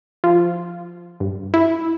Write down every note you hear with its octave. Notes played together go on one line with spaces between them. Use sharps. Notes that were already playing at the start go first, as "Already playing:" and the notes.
F3
G2
E4